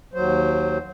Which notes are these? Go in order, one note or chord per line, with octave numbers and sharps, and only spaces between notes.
D#2 F#3 C5